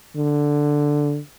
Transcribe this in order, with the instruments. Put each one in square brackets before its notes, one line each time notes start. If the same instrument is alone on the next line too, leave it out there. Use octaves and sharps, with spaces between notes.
[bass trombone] D3